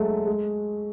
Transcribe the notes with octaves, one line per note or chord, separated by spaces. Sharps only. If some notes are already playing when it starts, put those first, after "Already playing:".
Already playing: F#3 G#3 A3
G#3